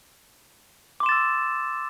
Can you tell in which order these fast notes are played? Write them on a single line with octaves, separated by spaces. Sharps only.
D6 C6 E7 A6 E6